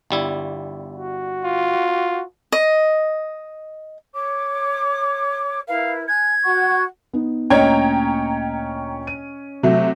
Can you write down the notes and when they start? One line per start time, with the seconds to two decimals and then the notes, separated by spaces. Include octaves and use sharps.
0.11 G1 G3 E4
0.94 F#4
1.44 F4
2.52 D#5
4.14 C#5 D6
5.68 E4 A#4 B4 F5
6.08 G#5 F#6 G#6
6.43 F#4 F#5 C#6
7.13 B3 D#4
7.50 D2 A#2 C#4 C#5 D#5 G5 A#5 G#6
9.07 D#7
9.63 C3 F#3 A3